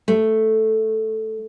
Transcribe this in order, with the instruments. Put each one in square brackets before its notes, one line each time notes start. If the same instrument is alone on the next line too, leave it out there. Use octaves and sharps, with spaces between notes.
[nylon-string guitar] A3